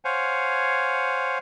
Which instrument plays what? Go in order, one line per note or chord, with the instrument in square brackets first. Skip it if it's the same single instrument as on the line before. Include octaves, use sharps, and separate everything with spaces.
[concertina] C5 C#5 F5 F#5 G#5